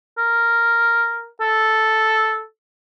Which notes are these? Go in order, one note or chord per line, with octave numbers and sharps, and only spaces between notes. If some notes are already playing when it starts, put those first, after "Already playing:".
A#4
A4